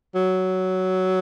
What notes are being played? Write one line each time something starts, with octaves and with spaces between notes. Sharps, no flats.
F#3